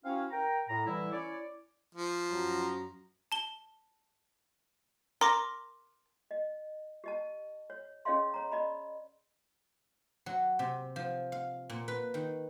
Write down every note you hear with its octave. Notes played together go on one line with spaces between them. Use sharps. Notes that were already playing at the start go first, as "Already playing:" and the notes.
C4 C#4 E4 F#4 F5
A#4 G5 A#5
A2 A#5
D3 E3 G3 E4
C#4 E4 C#5 D5
F3
F#2 F#3 A#5
A5 G7
A#4 C6 D6 A#6
D#5
G4 D#5 A5
C#5
C#4 G#4 C#5 D#5 F5 C6
C#5 A#5
D5 D#5 B5
F#3
C3
F3
F5
A#2
B4
D#3